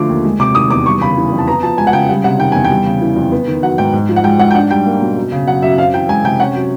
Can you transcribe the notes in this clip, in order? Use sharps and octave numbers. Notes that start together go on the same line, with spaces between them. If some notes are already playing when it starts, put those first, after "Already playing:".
Already playing: D3 F3 A3 D6
D#2
G#3
C3 D6
D#3 D#6
E2 D6
G3 C#6
C#3 B5
E3
F2
A5
B3 A#5
F3 A5
G#3 G#5
F#5
C#3 G5
G3 F#5
C3 F#5
D#3 G5
E2 G#5
G5
G3
C#3
E3
F2
B3
D#3
F#3 F#5
G#2 G5
G#2
F3
F#5
G#3 G5
G#2 F#5
G5
D4 F#5
G3 G5
A#3
B2
F#2
C#3
F#3 F#5
F#2 E5
C4 F5
E3 G5
G#3 G#5
C3 G5
C#4 F#5
F#3